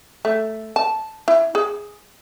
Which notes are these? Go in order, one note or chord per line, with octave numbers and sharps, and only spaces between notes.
A3
A5
E4
G#4